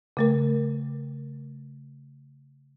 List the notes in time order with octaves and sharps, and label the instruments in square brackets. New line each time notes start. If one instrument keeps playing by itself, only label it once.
[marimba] C#3 A3 A#4